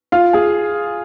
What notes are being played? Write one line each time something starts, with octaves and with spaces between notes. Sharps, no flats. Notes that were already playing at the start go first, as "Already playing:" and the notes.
F4 F5
G#4 G#5